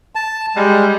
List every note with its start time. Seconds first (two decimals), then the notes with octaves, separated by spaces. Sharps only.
0.15 A5
0.56 G3 G#3